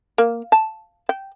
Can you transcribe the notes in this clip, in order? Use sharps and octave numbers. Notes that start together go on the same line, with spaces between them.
A#3
A5
G5